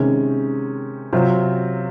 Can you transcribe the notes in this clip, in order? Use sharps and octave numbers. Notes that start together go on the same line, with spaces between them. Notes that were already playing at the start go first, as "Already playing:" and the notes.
Already playing: C3 D#3 G#3 C#4
C3 F#3 C4 F4